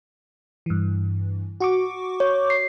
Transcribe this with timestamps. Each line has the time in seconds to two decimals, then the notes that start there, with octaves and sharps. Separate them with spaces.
0.66 G2 E3
1.60 F#4 C#6 D6
2.20 C#5
2.50 C7